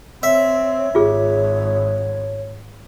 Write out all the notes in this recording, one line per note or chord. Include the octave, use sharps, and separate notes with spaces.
C4 C#5 E5
G#1 F4 G#4